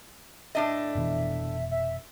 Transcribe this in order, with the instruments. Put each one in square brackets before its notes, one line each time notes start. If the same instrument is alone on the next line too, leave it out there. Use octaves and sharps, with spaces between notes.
[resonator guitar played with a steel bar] A2 D4 D#5 [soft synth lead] E5
[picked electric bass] F1 B2 E3
[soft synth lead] E5